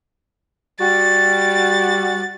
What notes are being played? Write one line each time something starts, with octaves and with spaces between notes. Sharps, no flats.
G3 F#4 A6